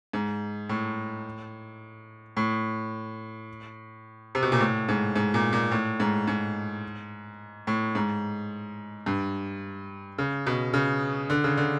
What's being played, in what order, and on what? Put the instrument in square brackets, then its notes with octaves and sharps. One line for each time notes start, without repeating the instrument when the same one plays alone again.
[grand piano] G#2
A2
A2
C3
B2
A#2
A2
G#2
G#2
A#2
A#2
A2
G#2
G#2
A2
G#2
G2
C#3
B2
C#3
D3
C#3
D3